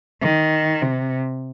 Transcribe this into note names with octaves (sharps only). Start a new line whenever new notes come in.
D#3
C3